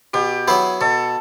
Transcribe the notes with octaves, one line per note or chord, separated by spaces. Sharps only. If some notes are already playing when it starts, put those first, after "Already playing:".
B2 G4
F#3 B3 E4 G#4
B2 A4